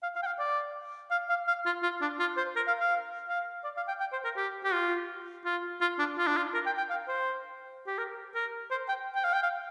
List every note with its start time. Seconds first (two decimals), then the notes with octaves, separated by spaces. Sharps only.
0.03 F5
0.15 F5
0.23 G5
0.27 F5
0.39 D5
1.11 F5
1.29 F5
1.48 F5
1.66 F4
1.83 F4
2.01 D4
2.20 F4
2.37 C5
2.56 A#4
2.67 F5
2.80 F5
3.28 F5
3.64 D5
3.77 F5
3.88 G5
4.00 G5
4.13 C5
4.25 A#4
4.37 G4
4.64 G4
4.73 F4
5.45 F4
5.81 F4
5.99 D4
6.18 F4
6.27 D4
6.37 F4
6.54 A#4
6.66 G5
6.78 G5
6.90 F5
7.08 C5
7.87 G4
7.98 A#4
8.35 A#4
8.71 C5
8.88 G5
9.16 G5
9.24 F5
9.34 G5
9.43 F5